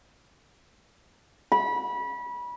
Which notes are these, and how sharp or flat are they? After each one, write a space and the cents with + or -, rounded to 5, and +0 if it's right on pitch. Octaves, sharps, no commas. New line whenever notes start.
B5 -25